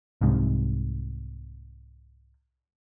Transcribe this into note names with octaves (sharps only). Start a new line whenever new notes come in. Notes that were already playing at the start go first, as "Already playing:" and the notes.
C2 G#2 C3